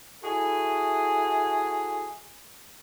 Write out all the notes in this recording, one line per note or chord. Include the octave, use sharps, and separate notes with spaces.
E4 F#4 G#4 A4 G#5